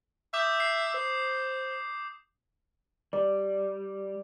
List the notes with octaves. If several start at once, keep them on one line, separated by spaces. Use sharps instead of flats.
E5 D6 D#6 G6
C7
C5
G3 D5